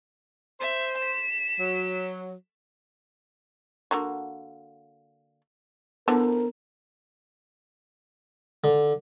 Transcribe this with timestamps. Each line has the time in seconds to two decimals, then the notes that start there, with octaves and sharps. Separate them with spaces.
0.60 C5 E5
0.98 B6 E7
1.59 F#3
3.91 D3 A#3 F#4
6.08 D3 E3 F3 B3 A#4
8.64 D3